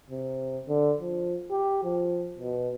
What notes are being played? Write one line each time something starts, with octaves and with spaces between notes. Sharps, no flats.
C3
D3
F3
G4
F3
B2